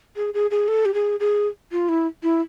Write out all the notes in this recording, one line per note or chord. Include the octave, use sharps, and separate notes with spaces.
G#4
G#4
G#4
A4
G4
G#4
G#4
F4
E4
E4